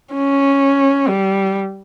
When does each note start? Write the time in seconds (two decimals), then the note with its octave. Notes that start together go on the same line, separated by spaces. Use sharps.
0.13 C#4
1.08 G3